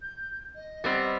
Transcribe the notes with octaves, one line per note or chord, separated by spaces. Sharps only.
G6
D#5
G3 B3 C4